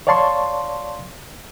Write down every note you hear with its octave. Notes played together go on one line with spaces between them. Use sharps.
C#5 D5 F5 A5 C6 C#6